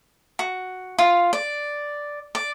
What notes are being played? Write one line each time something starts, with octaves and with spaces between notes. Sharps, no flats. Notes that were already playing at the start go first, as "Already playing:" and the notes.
F#4
F4
D5
D5